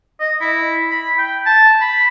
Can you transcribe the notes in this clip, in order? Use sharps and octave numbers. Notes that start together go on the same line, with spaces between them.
D#5
E4
B5
G5
A5
B5